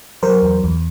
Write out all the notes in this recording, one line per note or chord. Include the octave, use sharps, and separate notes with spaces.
F#3 A#4 C5
E2
E2